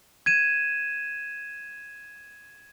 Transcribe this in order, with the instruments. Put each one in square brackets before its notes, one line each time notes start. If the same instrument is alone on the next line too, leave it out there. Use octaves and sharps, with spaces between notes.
[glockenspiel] G#6 D#7 E7